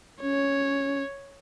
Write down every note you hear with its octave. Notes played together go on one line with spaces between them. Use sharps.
C#4 C#5